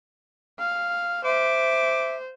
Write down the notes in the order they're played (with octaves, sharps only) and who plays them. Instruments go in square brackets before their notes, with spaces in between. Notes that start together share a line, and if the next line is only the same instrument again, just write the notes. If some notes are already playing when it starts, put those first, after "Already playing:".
[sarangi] F5
[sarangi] C5 [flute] E5 [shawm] D6